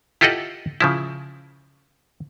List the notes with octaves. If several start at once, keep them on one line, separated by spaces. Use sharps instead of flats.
E4 F4 G4 A4 D#5 F#5
C#3 F3 E4